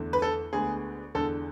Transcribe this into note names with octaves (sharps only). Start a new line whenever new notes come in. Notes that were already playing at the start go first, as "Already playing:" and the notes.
Already playing: E2 D3 A3
B4
A4
D2 D3 G#3 B3 G#4
E2 D3 G#3 A4